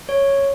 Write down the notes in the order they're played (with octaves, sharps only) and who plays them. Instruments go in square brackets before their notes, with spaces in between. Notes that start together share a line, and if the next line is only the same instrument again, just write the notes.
[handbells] C#5